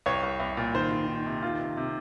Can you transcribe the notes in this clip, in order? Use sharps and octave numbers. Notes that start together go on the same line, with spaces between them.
C2 C#5
C2
C2
A#2
D#3 C5
D#3
D#3
C3
D#3 F4
C3
C3